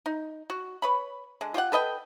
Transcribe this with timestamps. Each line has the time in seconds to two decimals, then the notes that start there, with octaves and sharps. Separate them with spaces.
0.06 D#4
0.50 F#4
0.82 B4 C#5 B5
1.41 D3 G#3
1.54 F4 G4 C5 F#5
1.72 A4 B4 D#5 G5